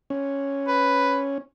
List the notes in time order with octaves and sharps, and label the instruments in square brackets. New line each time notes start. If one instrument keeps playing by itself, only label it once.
[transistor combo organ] C#4
[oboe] B4